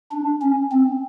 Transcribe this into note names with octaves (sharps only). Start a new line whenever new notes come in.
D4
C#4
C4